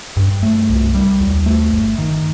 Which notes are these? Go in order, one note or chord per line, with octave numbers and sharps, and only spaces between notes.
G2
A3
C2
G3
D#2
A3
G1
D#3